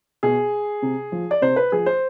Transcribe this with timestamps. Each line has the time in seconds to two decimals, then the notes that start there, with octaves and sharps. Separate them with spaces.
0.23 B2 G#4
0.82 C3
1.12 F3
1.31 D5
1.42 C3 C5
1.56 B4
1.72 F3 G#4
1.86 C5